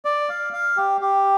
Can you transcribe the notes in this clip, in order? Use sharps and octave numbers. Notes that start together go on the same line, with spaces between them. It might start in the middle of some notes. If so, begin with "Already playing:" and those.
D5
F5
F5
G4
G4